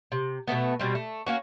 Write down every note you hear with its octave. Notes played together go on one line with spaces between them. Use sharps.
C3
B2 D3 A3 B3
B2 G3 C4
A3
A#3 C#4 F#4